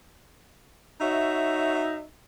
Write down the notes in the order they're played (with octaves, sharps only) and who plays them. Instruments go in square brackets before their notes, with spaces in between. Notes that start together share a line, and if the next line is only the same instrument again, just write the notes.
[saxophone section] D#4 F#4 C#5 E5